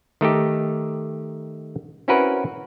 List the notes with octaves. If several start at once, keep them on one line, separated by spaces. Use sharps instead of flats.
D#3 A3 D#4 G4
C4 C#4 E4 F#4 A#4 B4